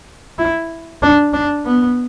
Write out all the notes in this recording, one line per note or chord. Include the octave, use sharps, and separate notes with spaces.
E4
D4
D4
B3